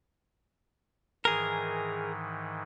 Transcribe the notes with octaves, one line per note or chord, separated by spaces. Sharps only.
G#2 D#3 E3 G#4 A#4